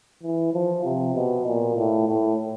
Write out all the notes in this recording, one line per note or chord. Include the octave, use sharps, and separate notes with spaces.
E3
F3
C3
B2
A#2
A2
A2